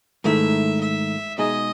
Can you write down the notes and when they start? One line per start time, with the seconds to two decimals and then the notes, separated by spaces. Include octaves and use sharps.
0.24 G#2 D#3 A3 E4 E5
0.81 E5
1.38 B2 G#3 D#4 G#4 D#5